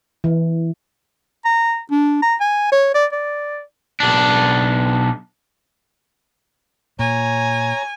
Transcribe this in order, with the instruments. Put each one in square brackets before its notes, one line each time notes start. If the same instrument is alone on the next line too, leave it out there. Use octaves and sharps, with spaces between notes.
[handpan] E3
[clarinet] A#5
D4
A#5
G#5
C#5
D5
D5
[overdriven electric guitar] B1 D4
[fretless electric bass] A#2 [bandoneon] C#5 A#5 [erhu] G#5